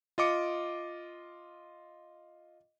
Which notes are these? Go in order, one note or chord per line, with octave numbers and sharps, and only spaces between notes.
F4 D#5 D6 C#7